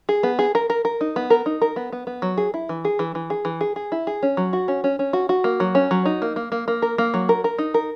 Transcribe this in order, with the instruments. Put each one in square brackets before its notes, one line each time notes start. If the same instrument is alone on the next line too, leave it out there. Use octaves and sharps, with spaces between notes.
[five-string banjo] G#4
B3
G#4
A#4
A#4
A#4
D#4
B3
A#4
D#4
A#4
B3
B3
B3
F#3
G#4
E4
E3
G#4
E3
E3
G#4
E3
G#4
G#4
E4
G#4
C#4
F#3
F#4
C#4
C#4
C#4
F#4
F#4
A#3
F#3
C#4
F#3
D#4
A#3
A#3
A#3
A#3
A#4
A#3
F#3
A#4
A#4
D#4
A#4